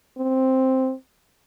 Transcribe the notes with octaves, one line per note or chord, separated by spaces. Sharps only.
C4